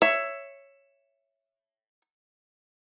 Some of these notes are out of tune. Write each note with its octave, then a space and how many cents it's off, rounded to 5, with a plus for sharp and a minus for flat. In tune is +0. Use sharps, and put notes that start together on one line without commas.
C#5 +0 E5 +10